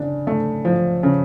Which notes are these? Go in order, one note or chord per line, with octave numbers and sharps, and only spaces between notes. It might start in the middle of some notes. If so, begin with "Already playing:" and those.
Already playing: C#3 D4
A3
F3
C#3